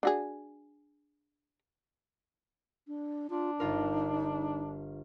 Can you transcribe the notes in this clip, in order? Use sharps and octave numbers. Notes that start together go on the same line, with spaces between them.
D4 F#4 G#4
D4
D4 F4
G1 D#4 F4 A#4